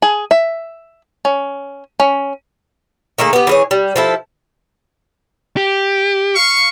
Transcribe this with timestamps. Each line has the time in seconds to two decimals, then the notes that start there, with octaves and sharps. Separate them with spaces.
0.02 G#4
0.31 E5
1.25 C#4
2.00 C#4
3.18 D#3 A3 A#3 G#4
3.33 B3 G4
3.47 E3 G#4 C#5
3.71 G3
3.96 F3 E4 A4
5.57 G4
6.36 F5 C#6